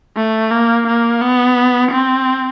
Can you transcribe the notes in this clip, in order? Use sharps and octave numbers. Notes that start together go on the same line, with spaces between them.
A3
A#3
A#3
B3
C4